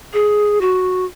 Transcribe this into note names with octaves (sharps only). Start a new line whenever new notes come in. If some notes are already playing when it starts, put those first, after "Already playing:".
G#4
F#4